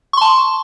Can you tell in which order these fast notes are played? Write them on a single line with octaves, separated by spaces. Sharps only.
C#6 C6 A5